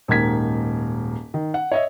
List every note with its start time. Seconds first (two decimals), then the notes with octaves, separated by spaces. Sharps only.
0.08 D#1 G#2 D#3 A#3 G#6 B6
1.34 D#3
1.54 F#5
1.72 C#5 D#5 E5